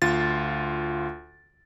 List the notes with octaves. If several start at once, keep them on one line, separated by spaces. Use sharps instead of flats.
D2 F4 A6